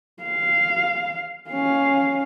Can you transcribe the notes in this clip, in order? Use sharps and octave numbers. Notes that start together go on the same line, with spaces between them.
F5
C#4 F5